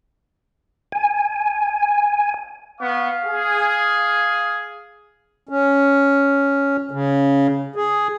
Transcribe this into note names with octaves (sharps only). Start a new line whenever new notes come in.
G#5
B3 F5 C#6
G#4
C#4
C#3
G#4